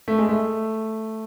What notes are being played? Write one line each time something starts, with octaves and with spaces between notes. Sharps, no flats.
A3
G#3
A3